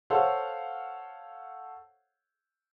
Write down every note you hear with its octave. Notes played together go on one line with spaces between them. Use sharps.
A4 C5 C#5 F5 F#5